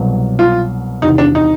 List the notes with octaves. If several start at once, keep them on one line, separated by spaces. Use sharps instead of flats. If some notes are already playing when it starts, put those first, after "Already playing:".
Already playing: C2 B2 F#3
F4
E2 C3 D#3 D#4
D4
D#4